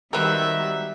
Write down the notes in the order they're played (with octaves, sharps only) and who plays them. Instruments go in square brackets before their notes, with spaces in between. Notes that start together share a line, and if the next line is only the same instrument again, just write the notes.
[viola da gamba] D#3 G3 [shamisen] B3 A#4 [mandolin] C4 F#4 E6 [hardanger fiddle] E5